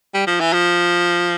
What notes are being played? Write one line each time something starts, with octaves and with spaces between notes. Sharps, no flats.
G3
F3
E3
F3